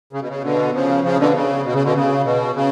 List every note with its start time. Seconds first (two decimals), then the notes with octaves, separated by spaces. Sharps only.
0.13 C#3
0.21 B2
0.29 C#3
0.43 B2 D3
0.74 C#3 F3
1.03 C#3 F3
1.19 B2 D3
1.34 C#3
1.65 B2
1.74 C#3
1.84 B2 D3
1.95 C#3
2.24 B2
2.55 C#3